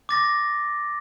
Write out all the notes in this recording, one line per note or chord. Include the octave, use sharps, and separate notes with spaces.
D6 A6 A#6